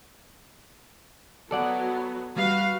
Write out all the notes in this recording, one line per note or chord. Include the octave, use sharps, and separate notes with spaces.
F#3 B3 A4 D5 F#5
G3 F#4 B4 F5